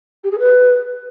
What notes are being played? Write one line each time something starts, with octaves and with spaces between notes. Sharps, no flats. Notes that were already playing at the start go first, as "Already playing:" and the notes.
G4
G#4
B4